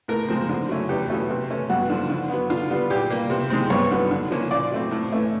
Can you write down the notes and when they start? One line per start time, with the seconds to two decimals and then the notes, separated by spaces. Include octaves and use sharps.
0.08 A2 A#4
0.28 F3 G#3 C4
0.49 D3
0.69 F#3 A3 C#4
0.89 E2 G4
1.10 B2 F#3 A3 C#4
1.30 C3
1.50 E3 A3 C#4
1.69 G2 F#4
1.90 D3 F3
2.10 D3
2.29 F#3 B3
2.50 D3 F4
2.70 G3 B3
2.90 A#2 G4
3.11 G3 A#3
3.30 C3
3.50 D#3 G#3 C4
3.70 G2 C#5
3.91 D3 F#3 B3
4.11 D3
4.31 F3 A#3 C#4
4.51 A#2 D5
4.71 F#3 A3 C4
4.91 A2
5.11 E3 A3 C#4